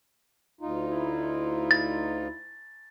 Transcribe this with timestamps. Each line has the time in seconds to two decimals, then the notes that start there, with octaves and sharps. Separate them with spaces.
0.61 D2 D#4 F4
0.91 E4
1.71 A6